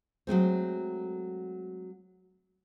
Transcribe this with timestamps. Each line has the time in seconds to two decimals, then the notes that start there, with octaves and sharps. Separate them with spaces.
0.27 F#3 G#3 A3 C4